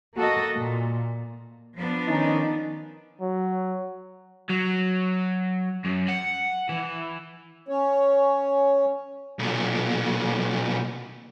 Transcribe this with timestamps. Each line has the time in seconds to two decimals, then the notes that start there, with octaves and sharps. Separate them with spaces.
0.15 A#3 F#4 A4 D#5
0.56 A#2
1.76 F3 B3 D4
2.08 D#3 C#4 D#4
3.21 F#3
4.49 F#3
5.85 F#2
6.08 F#5
6.69 E3
7.69 C#4 C#5
9.39 B1 A#2